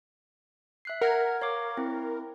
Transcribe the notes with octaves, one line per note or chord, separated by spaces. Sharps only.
E5 F#6 C7
A#4 F#5 F6 G#6
C#5 F5 D6
C4 E4